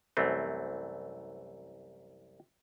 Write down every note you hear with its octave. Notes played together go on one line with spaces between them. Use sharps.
C2 F#2 E3 A3 C4